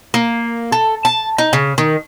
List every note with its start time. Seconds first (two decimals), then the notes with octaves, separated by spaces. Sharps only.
0.14 A#3
0.72 A4
1.05 A5
1.38 D#4
1.53 C#3
1.78 D#3